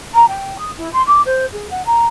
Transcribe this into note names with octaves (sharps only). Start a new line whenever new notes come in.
A#5
G5
D#6
E4
C6
D6
C5
G#4
F#5
A#5